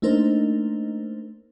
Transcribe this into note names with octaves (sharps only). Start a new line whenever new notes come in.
A3 A#3 D4 D#4 A#4 C5